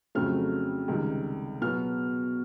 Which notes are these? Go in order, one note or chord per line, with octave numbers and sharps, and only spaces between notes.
F2 C#3 F#3 A3 C4 F6
C#2 C3 D#3 G3
B2 F#3 B3 F6